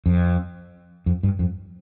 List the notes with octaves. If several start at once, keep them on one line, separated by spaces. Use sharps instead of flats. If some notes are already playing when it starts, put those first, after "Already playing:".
F2
F2
G2
F2